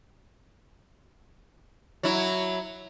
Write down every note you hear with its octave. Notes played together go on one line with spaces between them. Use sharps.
F#3 E4